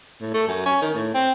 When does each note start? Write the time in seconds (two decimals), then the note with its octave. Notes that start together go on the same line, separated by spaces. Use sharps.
0.21 A2
0.34 A3
0.48 F#2
0.66 C#4
0.82 D#3
0.94 A2
1.14 C4